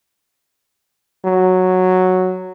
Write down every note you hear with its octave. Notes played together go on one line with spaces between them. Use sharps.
F#3